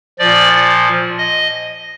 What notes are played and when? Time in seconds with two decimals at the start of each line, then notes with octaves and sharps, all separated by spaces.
0.19 A#2 F3 D5
1.18 D#5